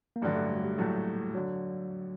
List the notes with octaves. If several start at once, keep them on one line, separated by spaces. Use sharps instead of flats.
A#3
A1 G2 D3 F#3 A3
A3
G3
F#3
G3
A#1 A2 F#3 A3
D3 F#3